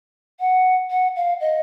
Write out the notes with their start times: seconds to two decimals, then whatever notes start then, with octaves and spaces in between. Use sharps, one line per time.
0.40 F#5
0.90 F#5
1.16 F5
1.41 D#5